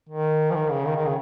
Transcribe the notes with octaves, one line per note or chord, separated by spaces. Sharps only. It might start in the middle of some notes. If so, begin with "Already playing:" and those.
D#3
F3
D#3
C#3
D#3
D#3
C#3